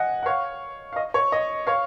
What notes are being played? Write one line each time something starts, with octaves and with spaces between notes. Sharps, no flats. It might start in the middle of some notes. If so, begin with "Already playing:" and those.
Already playing: D#5 F#5 G#5
F#5
C#5 F5
F5
D#5
C#5
D#5
C#5 F5